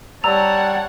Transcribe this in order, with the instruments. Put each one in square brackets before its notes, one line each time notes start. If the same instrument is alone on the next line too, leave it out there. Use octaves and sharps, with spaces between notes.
[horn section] G3 A5 [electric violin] C#5 F#5 [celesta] A#5 E6 F7